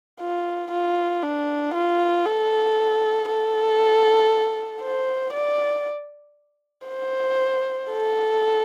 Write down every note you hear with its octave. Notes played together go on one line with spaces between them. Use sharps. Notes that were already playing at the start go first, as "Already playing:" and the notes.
F4
F4
D4
F4
A4
A4
C5
D5
C5
A4